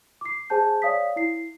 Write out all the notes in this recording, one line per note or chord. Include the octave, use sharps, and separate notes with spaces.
D6 C7
G#4 C5 G#5 A5 G6
C#5 D5 F5 D#6 B6
E4 C7